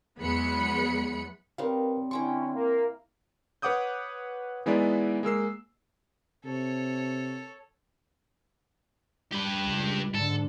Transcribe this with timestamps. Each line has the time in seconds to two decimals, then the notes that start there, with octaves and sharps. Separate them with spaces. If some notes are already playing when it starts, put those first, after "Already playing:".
0.19 E2 F#3 G#3 B3 B5 C#7
1.58 G3 C4 D#4 A#4 B4 C#5 F5
2.11 D3 E3 C#4 E4 G5 C6 C#6
2.55 A#3
3.62 B4 C#5 F#5 D6 D#6 G6
4.66 E3 G#3 B3 D#4 E4 D5
5.23 G#3 A#3 E6 C7
6.45 C3 A4 C#5
9.32 G3 G4 B4
9.66 C#2
10.15 G#2 D3 A4